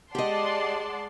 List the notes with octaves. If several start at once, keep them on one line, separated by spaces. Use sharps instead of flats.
G#3 G4 D5 D#5 F#5 A5 C6